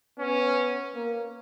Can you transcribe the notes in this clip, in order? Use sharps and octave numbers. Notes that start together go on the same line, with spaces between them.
B3 C#4
A#3